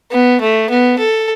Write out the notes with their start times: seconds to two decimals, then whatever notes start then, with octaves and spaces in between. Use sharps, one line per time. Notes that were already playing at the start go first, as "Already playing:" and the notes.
0.11 B3
0.40 A3
0.69 B3
0.99 A4